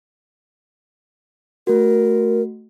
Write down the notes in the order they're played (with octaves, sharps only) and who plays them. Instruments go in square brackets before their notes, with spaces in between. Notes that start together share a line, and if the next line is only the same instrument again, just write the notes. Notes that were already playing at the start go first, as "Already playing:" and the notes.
[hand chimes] A3 F#4 [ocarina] A#4